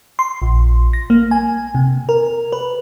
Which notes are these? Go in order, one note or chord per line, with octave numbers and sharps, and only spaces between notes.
C6
A#1
A#6
A#3
G#5
C3
A#4
B4